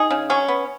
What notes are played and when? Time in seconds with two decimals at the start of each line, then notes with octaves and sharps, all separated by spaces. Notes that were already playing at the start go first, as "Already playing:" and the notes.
Already playing: D#4 G#4
0.11 C#3
0.30 F#3 C#4
0.48 B3